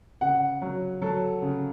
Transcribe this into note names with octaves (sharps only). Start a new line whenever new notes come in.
C#3 F#5
F#3
F#3 A4
C#3